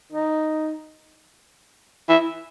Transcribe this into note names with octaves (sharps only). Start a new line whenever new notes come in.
D#4
E4